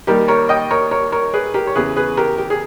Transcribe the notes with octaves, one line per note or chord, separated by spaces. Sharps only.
D#2 D#3 G3 G4 A#4
A#4 C#5
D#5 G5
A#4 C#5
A#4 C#5
A#4 C#5
G#4 B4
G4 A#4
C#5
E2 C#3 E3 G#4 B4
G#4 B4
G4 A#4
G4
G#4